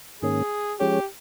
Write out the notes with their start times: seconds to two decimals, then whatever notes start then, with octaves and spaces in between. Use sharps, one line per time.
0.22 G#2 D#3 A#3 C#4 G#4
0.79 F3 G#3 C#4 G4 G#4 C#5